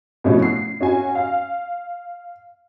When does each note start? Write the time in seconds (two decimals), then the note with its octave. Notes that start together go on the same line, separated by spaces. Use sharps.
0.24 B2 F3 A3 C#4 E4 F#4
0.42 C7
0.81 C#4 F#4 G#5
1.15 F5